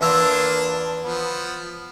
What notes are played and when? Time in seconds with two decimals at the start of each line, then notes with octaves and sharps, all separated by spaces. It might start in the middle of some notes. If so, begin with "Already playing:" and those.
0.01 E2 A#3 D4 E4 F4 A#5
1.04 F3 B3